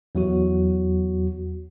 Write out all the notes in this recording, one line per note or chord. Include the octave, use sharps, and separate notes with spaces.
E2 F#3 F#4